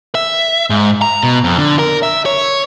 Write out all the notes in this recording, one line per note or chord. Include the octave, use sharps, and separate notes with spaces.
E5
G#2
A#5
B2
F2
D3
A#4
E5
C#5